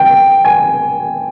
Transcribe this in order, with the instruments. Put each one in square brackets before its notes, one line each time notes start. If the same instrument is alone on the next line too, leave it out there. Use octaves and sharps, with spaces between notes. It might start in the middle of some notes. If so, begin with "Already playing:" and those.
Already playing: [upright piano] G5
G#5